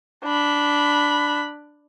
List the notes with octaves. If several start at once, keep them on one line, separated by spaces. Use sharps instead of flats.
D4 B5